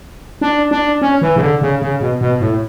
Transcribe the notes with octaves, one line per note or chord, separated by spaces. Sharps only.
D4
D4
C#4
E3
C#3
D3
C#3
C#3
B2
B2
A2